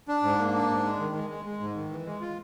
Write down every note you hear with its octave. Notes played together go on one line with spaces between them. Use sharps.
D4
G#2
A#3
D4
G#2
G#3
D#3
G#3
G#3
G#3
G#2
D#3
E3
G#3
F4